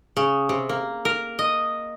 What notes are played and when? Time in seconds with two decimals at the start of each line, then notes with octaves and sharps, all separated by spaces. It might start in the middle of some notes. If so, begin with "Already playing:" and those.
0.17 C#3
0.49 C3
0.69 A#3
1.05 A#4
1.39 D#5